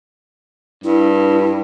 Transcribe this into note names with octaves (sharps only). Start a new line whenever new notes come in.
G2 E4